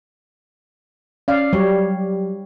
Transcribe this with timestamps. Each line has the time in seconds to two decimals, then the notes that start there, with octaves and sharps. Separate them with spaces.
1.28 C#4 D5 F5
1.53 F#3 G3 G4 C#5